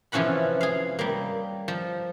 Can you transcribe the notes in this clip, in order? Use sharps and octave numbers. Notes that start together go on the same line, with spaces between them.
C3 E3 F3 C#4 F#5 B5
G#4 F5
G3 A#3
F3